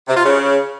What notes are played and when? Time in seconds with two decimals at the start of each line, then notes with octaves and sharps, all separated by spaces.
0.08 C3
0.17 F4
0.25 C#3